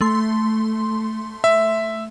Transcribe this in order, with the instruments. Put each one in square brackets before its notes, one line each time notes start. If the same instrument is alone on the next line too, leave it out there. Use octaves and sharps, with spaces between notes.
[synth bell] A3 C6
[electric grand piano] E5